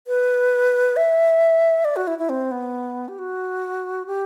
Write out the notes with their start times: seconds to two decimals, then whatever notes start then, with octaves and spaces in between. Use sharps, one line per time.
0.07 B4
0.96 E5
1.85 D5
1.96 F#4
2.07 E4
2.19 E4
2.29 C4
2.51 B3
3.08 G4
3.18 F#4
4.06 G4